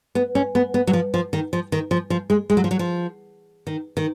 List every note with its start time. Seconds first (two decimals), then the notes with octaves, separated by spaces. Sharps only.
0.15 B3
0.35 C#4
0.55 B3
0.74 B3
0.87 F#3
0.93 F3
1.14 F3
1.33 D#3
1.53 F3
1.72 D#3
1.91 F3
2.10 F3
2.30 G#3
2.50 G#3
2.57 F#3
2.64 F3
2.71 F#3
2.79 F3
3.67 D#3
3.97 D#3